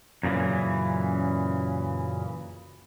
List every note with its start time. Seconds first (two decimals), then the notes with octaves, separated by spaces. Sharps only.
0.23 F#2 A#2 C#3 E3